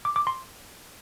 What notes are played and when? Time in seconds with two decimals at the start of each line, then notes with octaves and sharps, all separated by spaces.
0.05 D6
0.16 D6
0.27 C6